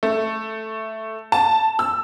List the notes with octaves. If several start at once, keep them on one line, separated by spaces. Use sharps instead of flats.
A3
A5
E6